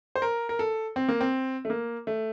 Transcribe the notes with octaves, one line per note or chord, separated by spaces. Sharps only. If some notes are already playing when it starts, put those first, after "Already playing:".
C5
A#4
A#4
A4
C4
A#3
C4
A3
A#3
A3